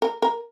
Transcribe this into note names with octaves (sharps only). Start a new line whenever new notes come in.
A#4
A#4